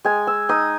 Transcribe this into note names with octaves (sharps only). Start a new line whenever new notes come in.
G#3 G#5
E6
D#4 D#6